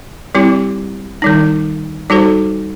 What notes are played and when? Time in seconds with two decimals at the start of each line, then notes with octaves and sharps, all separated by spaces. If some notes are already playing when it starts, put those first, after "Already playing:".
0.35 G3 C4 E4 G4
1.22 D#3 G3 D#4
2.10 G3 D#4 F#4 A4 C5